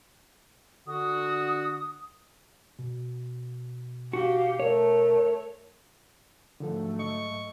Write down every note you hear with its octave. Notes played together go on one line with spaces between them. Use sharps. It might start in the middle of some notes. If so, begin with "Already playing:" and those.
D3 F#4 D#6
B2
F#4 G4 F5
A3 A#4 C#5
G#2 D3 F3 F#3 A3 A4
D#5 C#6